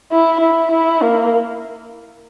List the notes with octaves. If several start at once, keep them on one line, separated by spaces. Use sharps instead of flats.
E4
E4
E4
A#3